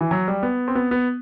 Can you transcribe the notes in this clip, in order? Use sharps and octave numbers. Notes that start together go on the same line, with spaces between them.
E3
F#3
G3
B3
C4
B3
B3